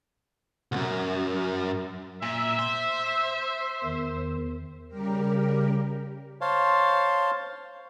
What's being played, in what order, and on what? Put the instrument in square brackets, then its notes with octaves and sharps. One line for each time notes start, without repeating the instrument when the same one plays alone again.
[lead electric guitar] C2 F#2
[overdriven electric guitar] A#2 [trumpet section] E5
[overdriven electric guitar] C5
[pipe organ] E2 D#3
[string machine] C#3 G3 G4 A#4
[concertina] C5 C#5 F5 A5 C6